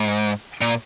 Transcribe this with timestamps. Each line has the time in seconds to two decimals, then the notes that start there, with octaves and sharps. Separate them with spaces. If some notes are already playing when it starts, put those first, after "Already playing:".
Already playing: G#2
0.61 A#2